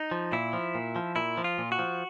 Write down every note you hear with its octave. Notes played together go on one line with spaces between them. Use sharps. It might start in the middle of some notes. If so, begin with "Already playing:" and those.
Already playing: D#4
F3
A#2 E4
F3
A#2
F3
A#2 E4
F3
F4
A#2
F#4
F3